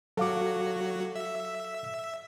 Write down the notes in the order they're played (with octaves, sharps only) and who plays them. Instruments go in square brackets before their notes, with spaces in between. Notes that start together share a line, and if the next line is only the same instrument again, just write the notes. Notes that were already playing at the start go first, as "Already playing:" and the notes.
[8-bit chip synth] F#3 F#4 [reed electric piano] A4 F5 D6
[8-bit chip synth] E5